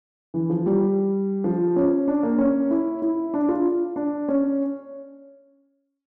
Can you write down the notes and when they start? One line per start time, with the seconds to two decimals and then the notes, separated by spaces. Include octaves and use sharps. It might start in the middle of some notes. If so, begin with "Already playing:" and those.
0.34 E3
0.50 F3
0.66 G3
1.44 F3
1.76 C#4
2.08 D4
2.23 A#3
2.38 C#4
2.71 E4
3.02 E4
3.34 D4
3.49 F4
3.96 D4
4.28 C#4